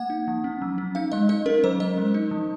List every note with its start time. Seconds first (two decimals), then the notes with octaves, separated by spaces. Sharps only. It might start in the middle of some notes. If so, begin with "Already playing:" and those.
Already playing: A#3 F#5
0.10 D#4
0.28 F3
0.44 C#4
0.62 F#3
0.78 C#4
0.95 D#4 F5
1.12 G#3 D#5
1.29 D#4 D#5
1.46 C#4 A#4
1.64 F#3 C5
1.80 C#4 D#5
1.98 G#3
2.14 D#4
2.31 F3